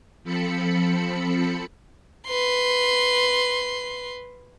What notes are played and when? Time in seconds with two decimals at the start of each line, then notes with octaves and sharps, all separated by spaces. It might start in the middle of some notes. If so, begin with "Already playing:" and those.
0.24 F3 C4 A4 B5 C#7
2.27 B4 C6